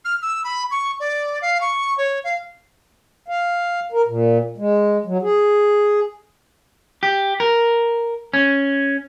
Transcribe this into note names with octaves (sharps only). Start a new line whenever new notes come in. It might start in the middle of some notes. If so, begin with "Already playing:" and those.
F6
E6
B5
C#6
D5
F5
C#6
C#5
F5
F5
A#4
A#2
G#3
F#3
G#4
G4
A#4
C#4